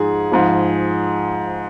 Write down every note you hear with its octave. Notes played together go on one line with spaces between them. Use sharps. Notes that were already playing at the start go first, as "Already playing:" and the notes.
Already playing: G#2 F3 G#4
G#2 F3